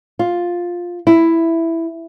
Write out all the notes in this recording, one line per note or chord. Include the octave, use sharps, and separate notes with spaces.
F4
E4